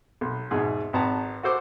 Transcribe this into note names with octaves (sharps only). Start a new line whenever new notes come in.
B1
E2 G#2 B2 G#4
G#1 B3 A5 A#5
F#4 A4 C5 D6